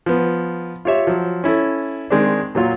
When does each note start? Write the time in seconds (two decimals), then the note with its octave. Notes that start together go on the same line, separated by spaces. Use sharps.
0.06 F3 B3
0.85 F4 G4 C#5 E5
1.07 F3 F#3
1.44 C#4 E4 A4
2.10 D#3 G#3 C4 D4
2.55 A#2 F#3 F4